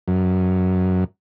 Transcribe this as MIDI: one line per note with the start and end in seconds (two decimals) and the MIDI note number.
0.08 1.04 42